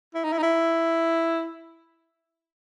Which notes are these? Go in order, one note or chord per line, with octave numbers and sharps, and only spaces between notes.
E4
D#4
E4
D#4
E4